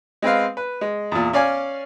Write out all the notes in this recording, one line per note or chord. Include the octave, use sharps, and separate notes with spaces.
G#3 C4 B4 F5
B4
G#3
E2 A#2
C#4 D5 F5 G#5